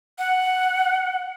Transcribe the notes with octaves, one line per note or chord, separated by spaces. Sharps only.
F#5